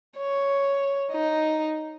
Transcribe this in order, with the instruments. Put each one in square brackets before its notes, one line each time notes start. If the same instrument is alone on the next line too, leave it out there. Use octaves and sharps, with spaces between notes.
[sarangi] C#5
D#4